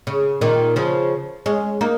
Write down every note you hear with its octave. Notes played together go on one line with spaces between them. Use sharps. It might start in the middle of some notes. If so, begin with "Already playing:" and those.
C#3
A#2 D#3
C#3 F3
G#3 C#4
A#3 D#4